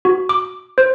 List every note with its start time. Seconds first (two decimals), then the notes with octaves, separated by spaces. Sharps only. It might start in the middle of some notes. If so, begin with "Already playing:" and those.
0.05 F#4
0.29 D6
0.78 C5